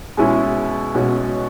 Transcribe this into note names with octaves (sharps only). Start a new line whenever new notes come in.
B2 G#3 C#4 E4
B1 B2 G#3 C#4 F#4